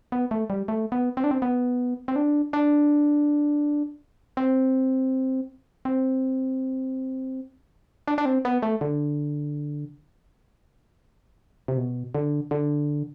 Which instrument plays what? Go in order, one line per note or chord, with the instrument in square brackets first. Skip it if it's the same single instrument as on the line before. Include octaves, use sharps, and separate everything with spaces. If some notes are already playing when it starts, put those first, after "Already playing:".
[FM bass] B3
A3
G3
A3
B3
C4
D4
C4
B3
C4
D4
D4
C4
C4
D4
D4
C4
B3
A3
D3
C3
B2
D3
D3